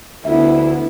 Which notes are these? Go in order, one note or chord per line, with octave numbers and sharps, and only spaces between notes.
D2 B3 E4 E5